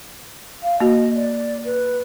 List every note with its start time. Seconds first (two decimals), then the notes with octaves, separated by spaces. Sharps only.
0.63 F5
0.80 A#3 F#4 D#5
1.15 D5
1.65 B4